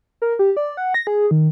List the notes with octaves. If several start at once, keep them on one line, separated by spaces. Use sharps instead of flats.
A#4
G4
D5
F#5
A#6
G#4
D#3